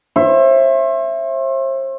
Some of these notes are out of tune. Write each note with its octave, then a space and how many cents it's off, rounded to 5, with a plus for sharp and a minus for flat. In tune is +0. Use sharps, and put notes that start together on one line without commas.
C5 +40 E5 +15